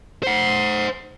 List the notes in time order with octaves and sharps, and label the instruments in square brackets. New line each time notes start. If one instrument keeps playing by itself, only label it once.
[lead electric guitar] C5 F#5 [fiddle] C6